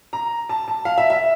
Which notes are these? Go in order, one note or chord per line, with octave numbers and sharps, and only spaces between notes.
A#5
A5
A5
F5
E5
E5